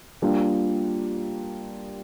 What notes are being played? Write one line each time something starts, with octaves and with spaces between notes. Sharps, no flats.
G3 A#3 D4 F4